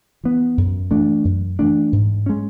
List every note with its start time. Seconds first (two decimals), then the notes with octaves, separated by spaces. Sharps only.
0.24 E3 B3
0.58 F#2
0.91 E3 A3 D4
1.25 F#2
1.59 E3 A3 D4
1.92 G#2
2.26 G#3 C#4